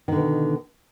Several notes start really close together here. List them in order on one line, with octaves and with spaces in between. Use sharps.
D#3 D3 B2